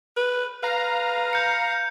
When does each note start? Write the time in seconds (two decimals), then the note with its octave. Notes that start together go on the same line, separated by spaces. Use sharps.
0.17 B4
0.63 B4 F5 A#5
1.33 G6 C#7